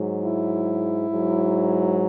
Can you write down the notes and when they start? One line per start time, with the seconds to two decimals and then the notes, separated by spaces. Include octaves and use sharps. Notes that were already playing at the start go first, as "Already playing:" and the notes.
Already playing: G#2 F#3
0.23 E4
1.10 G#2 F#3